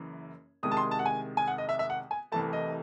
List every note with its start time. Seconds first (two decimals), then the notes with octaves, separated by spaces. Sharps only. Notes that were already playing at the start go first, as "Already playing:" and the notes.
Already playing: F#1 F#2 E3
0.63 C2 C3 D#3 G#3 D#6
0.71 A5
0.77 C6
0.91 A5
0.99 F#5
1.06 G#5
1.37 G#5
1.48 F#5
1.58 D#5
1.69 E5
1.79 E5
1.90 F#5
2.11 G#5
2.32 C2 C3 E3 A3 A5
2.53 D#5